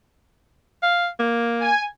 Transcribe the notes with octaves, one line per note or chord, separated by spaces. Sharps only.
F5
A#3
G#5